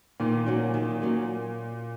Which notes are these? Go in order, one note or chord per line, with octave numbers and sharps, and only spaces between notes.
A#2 D#3
F#3 A#3 C#4 F#4
D#3
F#3 A#3 C#4